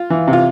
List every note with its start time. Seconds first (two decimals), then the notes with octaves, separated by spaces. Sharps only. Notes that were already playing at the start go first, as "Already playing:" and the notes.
Already playing: F4
0.10 E3
0.28 C3
0.33 F4